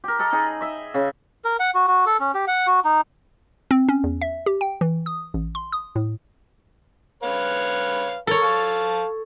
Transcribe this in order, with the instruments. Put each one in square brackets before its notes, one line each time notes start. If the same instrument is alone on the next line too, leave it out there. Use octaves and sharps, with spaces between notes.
[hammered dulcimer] G4 A#4
A4 A#4 D#5
D#4 G#4 B5
D#5 E5
C#3
[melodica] A#4
F#5
F#4
F#4
A4
C#4
G4
F#5
F#4
D#4
[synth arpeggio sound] C4
C#4
E2
E5
G4
G5
E3
D#6
A1
C6
D#6
A2
[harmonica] B4 C#5 F5
[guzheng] A4 C#5 [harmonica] A#4
[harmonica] F5 A5